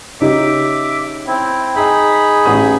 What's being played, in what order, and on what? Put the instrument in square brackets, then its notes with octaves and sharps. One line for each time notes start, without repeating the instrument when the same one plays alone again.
[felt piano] C#3 D#4 G4 [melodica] E5 D6
[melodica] C4 E4
[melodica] D#4 G#4 B5 [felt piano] D#5
[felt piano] A1 D#6